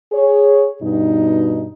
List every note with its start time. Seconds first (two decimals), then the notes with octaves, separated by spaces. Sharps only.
0.13 G#4 C#5
0.82 G2 B2 D#4